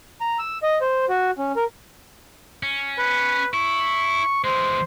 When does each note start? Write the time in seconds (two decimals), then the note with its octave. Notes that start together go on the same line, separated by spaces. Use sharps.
0.21 A#5
0.39 E6
0.63 D#5
0.81 C5
1.09 F#4
1.38 C#4
1.56 A#4
2.63 C#4
2.98 B4
3.54 E4 C#6
4.44 E3 G#3 C5